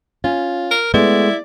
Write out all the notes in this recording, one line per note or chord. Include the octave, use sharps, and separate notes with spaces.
C#4 F4
A#4
G#3 A3 B3 E4 D5